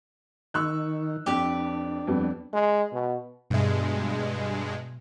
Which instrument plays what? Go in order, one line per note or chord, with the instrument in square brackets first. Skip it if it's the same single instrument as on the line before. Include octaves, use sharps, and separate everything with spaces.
[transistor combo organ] D#3 [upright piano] C#6 E6 F#6
[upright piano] F2 [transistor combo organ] D4 [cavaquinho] G4 B4
[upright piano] F2 G3 B3
[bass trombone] G#3
B2
[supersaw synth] G2 G#3 [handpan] B2 E5